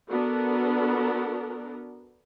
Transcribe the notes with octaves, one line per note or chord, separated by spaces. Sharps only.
B3 D4 F#4 A4 A#4